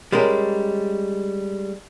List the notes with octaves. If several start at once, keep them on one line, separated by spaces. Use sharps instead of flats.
G3 G#3 C#4 A#4